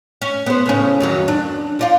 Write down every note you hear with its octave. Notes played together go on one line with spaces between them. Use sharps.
C#4
B3 C5
A2 C#3 C#4
F2 D#3 F#3
D4
F3 D4 F4